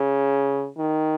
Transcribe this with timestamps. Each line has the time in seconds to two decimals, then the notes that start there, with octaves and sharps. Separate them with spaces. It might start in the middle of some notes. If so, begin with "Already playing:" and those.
Already playing: C#3
0.78 D#3